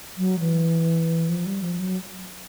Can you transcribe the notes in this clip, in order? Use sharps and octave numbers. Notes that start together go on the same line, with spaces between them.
F#3
E3
F3
G3
F3
F#3